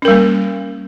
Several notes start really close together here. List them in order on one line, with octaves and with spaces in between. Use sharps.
C#4 A#4 G3 A#3